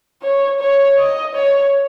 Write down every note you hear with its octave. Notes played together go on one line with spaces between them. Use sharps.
C#5
C#5
D#5
C#5